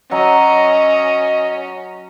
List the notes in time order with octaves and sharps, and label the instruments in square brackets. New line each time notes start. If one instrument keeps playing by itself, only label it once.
[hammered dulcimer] F#3 [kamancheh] C#4 [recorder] D#5